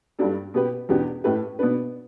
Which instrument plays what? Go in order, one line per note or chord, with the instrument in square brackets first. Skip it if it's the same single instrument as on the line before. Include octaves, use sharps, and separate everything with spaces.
[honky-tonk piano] G2 G3 D4 A4
B2 B3 G4 B4
E2 B2 B3 D4 G4
A2 A3 G4 B4
B2 B3 D4 B4